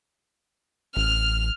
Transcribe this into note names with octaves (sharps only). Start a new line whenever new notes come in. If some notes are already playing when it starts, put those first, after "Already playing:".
A1 F6